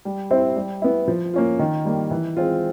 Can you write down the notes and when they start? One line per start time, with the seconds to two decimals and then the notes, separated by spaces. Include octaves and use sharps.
0.05 G3
0.30 C4 E4 G4 C5
0.56 G3
0.82 B3 E4
1.08 F3
1.34 A#3 C#4 F4
1.59 D#3
1.85 G3 A#3
2.11 E3
2.37 G#3 C4 F4